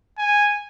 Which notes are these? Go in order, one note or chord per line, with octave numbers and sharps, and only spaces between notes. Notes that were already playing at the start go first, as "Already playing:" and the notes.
G#5